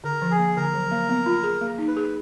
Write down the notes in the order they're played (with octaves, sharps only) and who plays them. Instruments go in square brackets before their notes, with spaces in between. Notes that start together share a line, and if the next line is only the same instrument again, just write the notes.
[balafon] D3 [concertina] A#4
[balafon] F3
[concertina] G#4
[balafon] A#3
[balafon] D3 [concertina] A#4
[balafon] F#3
A#3
B3
F4
G#4
A#3
D#4
[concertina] B4
[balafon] G#4